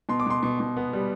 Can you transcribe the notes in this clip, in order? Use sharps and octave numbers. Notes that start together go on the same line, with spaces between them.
B2 C6
D6
B2 C6
B2
B2
B3
G3